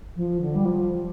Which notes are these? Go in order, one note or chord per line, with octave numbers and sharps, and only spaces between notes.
F3
D3
G3
F3